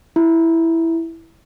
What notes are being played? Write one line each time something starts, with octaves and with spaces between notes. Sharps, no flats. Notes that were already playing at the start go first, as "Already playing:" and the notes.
E4